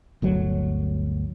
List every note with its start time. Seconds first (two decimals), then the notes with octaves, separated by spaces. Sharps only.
0.22 G1 D2 F#3